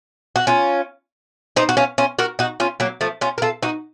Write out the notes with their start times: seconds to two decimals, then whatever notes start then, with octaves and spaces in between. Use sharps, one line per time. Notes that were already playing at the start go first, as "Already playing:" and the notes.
0.36 F#4
0.47 C#4 F4
1.56 C4 D#4
1.69 F#4
1.77 C#4 F4
1.98 C#4 F4
2.19 F#4 A#4
2.39 D#4 F#4
2.60 C#4 F4
2.80 F#3 A#3
3.01 F3 A3
3.21 C#4 F4
3.38 A#4
3.42 F4 A4
3.63 D#4 F#4